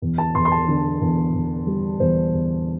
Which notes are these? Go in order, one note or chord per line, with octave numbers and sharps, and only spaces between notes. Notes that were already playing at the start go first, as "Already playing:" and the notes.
E2
A5
E2 C6
C6
A5
D3
E2
E2
G3
E2 C5
E2